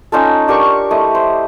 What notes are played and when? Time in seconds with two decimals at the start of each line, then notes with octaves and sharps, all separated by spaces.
0.12 C#4 D#4 F4 A4
0.48 D4 G4 A#4 C#6
0.91 A3 E4 D#5
1.15 C5